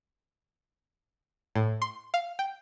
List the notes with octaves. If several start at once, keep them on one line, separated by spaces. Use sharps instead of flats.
A2
C6
F5
G5